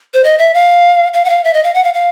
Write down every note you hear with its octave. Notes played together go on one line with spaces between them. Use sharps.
C5
D#5
E5
F5
F5
F#5
F5
E5
D#5
F5
F#5
F5
F5